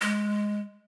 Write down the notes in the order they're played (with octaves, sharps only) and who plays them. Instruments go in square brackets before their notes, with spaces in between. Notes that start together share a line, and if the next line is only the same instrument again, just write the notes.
[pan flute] G#3